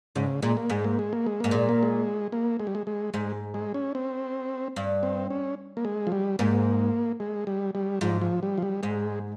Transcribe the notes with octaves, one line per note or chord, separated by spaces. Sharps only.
G#2 C#3
A#2 G#3
A#3
G#2 G#3
A#3
G#3
A#3
G#3
G#2 A#3
A#2 G#3
A#3
G#3
A#3
G#3
G3
G#3
G#3
G#2 G#3
G#3
C#4
C4
G2
C4
C#4
A#3
G#3
F3
G3
G#2 A#3
G#3
G3
G3
G#2 F3
F3
G3
F3
G3
G#2 G#3